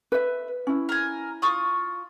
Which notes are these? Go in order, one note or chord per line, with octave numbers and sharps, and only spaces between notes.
B4 E5
C#4 E4
A#4 G#5
F4 C#6 D#6